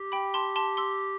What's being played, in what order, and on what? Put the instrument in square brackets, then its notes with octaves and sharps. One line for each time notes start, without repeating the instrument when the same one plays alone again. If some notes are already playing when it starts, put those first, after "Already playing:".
Already playing: [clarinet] G4
[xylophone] G5 B5
A5 C6
A5 C6
C6 E6